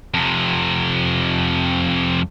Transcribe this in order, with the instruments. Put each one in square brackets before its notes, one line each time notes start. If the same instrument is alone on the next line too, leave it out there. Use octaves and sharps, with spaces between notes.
[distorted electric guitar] F2 C3